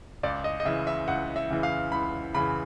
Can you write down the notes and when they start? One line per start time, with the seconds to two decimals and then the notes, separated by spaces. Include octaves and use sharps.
0.23 C#2 D5
0.44 D#5
0.60 D#5
0.65 C#3 E3 E5
0.87 E5
1.08 C#2 F#5
1.36 E5
1.50 C#3 E3
1.63 F5
1.92 C#2 B5
2.34 C#3 E3 B5